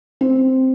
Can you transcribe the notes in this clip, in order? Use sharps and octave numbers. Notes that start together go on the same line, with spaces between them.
C4